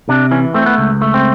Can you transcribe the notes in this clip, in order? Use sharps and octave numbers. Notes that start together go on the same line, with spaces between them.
C3 D4
E3 C#4
A3 C4
B3
C#2
A3
C4